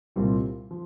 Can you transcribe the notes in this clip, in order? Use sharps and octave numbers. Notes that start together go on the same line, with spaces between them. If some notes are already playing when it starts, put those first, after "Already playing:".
C2 A#2 G3 C4 F4
F3